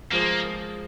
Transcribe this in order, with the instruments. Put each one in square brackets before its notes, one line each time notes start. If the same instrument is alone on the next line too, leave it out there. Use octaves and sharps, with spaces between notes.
[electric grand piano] F3 G#3 F4 G#4 C5 [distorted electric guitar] A#3